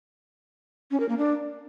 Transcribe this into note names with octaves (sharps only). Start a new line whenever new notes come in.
C#4
A#4
A#3
D4